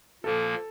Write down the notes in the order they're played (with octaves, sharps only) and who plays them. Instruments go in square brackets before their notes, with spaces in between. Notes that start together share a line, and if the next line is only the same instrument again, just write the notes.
[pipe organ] A#2 F3 A#3 [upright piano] A4